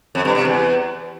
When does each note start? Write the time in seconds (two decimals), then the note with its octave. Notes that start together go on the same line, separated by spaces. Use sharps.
0.15 F2
0.25 G2
0.35 C3
0.45 E2